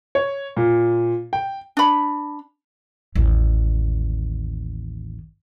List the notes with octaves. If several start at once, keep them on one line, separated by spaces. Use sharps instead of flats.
C#5
A#2
G5
D4 B5
A1 D#2